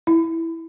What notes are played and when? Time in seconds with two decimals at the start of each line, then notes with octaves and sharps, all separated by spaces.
0.07 E4